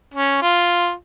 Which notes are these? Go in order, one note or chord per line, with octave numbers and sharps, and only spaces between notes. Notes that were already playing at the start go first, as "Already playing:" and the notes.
C#4
F4